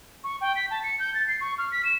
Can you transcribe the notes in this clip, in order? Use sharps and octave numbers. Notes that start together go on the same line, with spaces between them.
C#6
G5
B6
A5
C#7
G6
A6
C7
C#6
F6
B6
E7